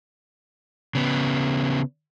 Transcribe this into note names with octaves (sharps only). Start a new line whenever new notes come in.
C#3 B3